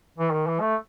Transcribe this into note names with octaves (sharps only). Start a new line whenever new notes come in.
E3
D#3
E3
A3